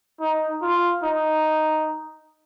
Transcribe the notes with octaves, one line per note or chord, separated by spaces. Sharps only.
D#4
F4
D#4